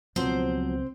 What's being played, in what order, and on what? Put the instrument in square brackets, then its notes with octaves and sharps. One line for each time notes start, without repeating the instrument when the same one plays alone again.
[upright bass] C#2 B2 [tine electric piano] F3 F#3 B3 [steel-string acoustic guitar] C4 C5